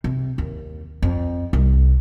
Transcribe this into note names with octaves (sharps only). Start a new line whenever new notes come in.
C3
D#2
F2
C2